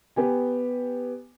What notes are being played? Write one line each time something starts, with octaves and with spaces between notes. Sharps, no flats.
B3 G4 G#5